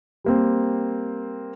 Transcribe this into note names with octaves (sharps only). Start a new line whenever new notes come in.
G3 A#3 C4